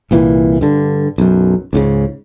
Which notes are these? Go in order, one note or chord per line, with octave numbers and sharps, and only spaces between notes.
C2 A#2 E3
G2 D3
B1 F#2
C#2 G#2 C#3